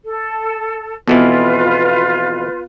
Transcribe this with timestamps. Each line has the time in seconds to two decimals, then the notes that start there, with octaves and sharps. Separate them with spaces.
0.03 A4
1.08 F2 B2 E3 B3 F4 B4